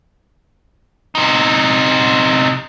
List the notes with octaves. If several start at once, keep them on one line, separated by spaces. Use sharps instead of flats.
C3 D#4